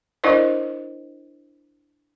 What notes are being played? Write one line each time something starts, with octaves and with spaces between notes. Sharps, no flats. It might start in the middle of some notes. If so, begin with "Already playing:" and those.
D4 E4 A#4 C5 D5 D#5